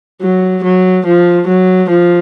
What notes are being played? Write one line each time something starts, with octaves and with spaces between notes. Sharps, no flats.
F#3
F#3
F3
F#3
F3